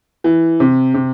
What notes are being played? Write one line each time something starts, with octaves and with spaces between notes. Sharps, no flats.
E3
C3
C3